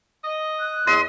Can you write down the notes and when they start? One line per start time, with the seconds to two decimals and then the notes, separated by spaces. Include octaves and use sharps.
0.25 D#5
0.59 F#6
0.87 E2 D#5 C6